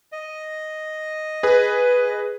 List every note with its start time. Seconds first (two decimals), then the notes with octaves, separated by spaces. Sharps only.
0.12 D#5
1.43 G#4 B4